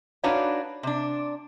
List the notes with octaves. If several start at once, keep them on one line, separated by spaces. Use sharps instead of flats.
D4 D#4 F#4 B4 C#5 F5
C3 D4